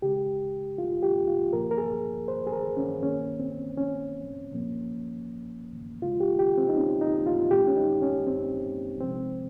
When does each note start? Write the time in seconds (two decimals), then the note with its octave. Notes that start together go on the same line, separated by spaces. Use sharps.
0.02 C#3 G#3 G4
0.78 F4
1.03 G4
1.28 F4
1.52 A#2 F3 A#3 A#4
1.71 A#4
1.78 G#4
2.28 C5
2.47 G#4
2.52 A#4
2.77 C#4
3.02 D#3 A#3 C#4
3.40 C4
3.77 C#4
4.52 A#2 F3 A#3
6.02 C#3 G#3 F4
6.20 G4
6.39 G4
6.58 C4
6.69 D#4
6.77 C#4
7.01 D#4
7.27 F4
7.51 A#2 G#3 G4
7.68 C#4
7.77 D#4
8.02 C#4
8.27 C4
9.01 C3 F3 G#3 C4